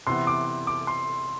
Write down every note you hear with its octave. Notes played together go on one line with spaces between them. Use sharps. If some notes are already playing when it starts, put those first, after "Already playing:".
C3 E3 B3 C6
D6
D6
C6